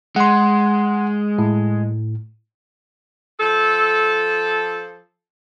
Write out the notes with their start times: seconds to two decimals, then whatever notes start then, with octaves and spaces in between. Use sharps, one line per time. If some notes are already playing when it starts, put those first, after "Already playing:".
0.16 G#3 F#5 C6
1.38 A2
3.39 F3 A4